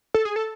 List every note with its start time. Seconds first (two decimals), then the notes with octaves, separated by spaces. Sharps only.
0.14 A4
0.25 G#4
0.36 A4